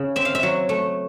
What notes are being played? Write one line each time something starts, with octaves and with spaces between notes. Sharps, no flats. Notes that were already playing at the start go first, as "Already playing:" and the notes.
Already playing: C#3
C4 E5
F5
E5
F#3
A3